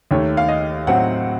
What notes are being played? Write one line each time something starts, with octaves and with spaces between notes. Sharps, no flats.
D#2 D#3 A3 C#5
F5
D#5
A2 F#3 C4 F#5